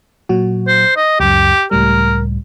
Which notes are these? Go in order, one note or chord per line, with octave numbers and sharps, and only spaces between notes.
A#2 F#3 F#4
C5
D#5
C#2 F#2 G4
C#2 A2 G3 A#4